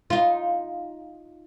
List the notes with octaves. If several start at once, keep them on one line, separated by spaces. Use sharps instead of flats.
D#4 F4